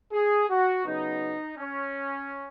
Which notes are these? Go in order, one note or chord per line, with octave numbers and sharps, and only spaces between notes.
G#4
F#4
C#3 F#3 B3 D#4
C#4